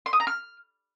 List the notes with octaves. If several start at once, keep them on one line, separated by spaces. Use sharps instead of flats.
C6
D#6
A#5
F6